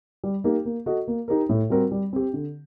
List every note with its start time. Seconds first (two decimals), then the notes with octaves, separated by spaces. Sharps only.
0.24 G3
0.44 A#3 D#4 G4
0.65 A#3
0.86 F#4 A4 D#5
1.08 A#3
1.28 D#4 G4 A#4
1.49 A2
1.70 G3 C4 F#4 A#4
1.91 G3
2.13 C4 G4
2.34 D3